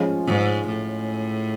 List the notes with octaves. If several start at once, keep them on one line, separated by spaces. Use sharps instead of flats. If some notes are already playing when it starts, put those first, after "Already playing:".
Already playing: F3 G#3 C#4 F4
G#2
A2